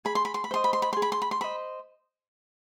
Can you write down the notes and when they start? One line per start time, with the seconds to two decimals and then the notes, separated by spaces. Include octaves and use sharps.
0.05 G#4 B5
0.15 C6
0.25 B5
0.34 C6
0.44 B5
0.51 C5 D#5 C6
0.64 B5
0.73 C6
0.82 B5
0.93 G#4 C6
1.02 B5
1.12 C6
1.22 B5
1.31 C6
1.41 C5 D#5 B5